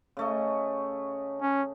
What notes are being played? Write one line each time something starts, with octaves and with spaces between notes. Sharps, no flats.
C#3 A3 D#5
C#4